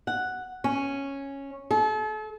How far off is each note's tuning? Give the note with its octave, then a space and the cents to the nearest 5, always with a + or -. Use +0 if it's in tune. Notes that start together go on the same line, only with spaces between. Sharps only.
F#5 +0
C#4 -5
A4 -40